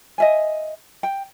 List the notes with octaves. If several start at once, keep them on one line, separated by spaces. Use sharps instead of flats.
D#5 E5 G#5
G5